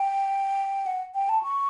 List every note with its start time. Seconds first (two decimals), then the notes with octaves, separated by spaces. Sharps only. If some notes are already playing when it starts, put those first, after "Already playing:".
Already playing: G5
0.86 F#5
1.15 G5
1.29 A5
1.43 C#6